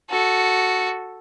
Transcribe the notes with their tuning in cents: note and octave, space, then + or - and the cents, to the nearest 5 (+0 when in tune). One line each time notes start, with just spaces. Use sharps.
F#4 +0 A4 +0